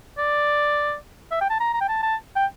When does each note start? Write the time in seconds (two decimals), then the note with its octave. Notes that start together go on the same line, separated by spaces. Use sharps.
0.18 D5
1.31 E5
1.41 G5
1.49 A5
1.60 A#5
1.73 A#5
1.81 G5
1.88 A5
2.02 A5
2.36 G5